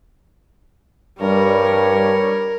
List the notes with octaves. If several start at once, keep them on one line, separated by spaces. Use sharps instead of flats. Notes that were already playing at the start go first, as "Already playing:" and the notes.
G2 G3 A#4 C#5